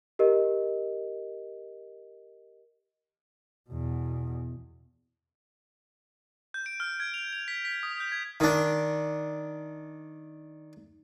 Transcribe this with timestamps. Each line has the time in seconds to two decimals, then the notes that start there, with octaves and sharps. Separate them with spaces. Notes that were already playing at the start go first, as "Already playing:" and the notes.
0.19 G4 A#4 D#5
3.69 E2 B2
6.54 G6
6.66 D7
6.80 F6
7.00 G#6
7.14 F7
7.33 F7
7.48 B6
7.65 B6
7.83 D#6
8.00 G6
8.12 G#6
8.40 D#3 D4